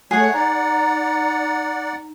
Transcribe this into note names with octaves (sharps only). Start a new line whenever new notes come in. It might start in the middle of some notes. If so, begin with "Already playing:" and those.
A3 G#4 C#5 F#5
D#4 D5 F#5 A#5